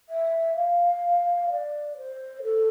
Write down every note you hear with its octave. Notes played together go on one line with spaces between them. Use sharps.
E5
F5
D5
C5
A4